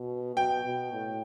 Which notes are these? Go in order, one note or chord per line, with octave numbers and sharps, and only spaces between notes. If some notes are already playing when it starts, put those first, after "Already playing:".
Already playing: B2
B2 G5
B2
A2